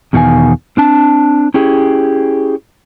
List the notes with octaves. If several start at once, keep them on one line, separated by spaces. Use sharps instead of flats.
E2 B2 D#3 F4 F5 G#5
C4 D4 A5
C#4 E4 G4 G#4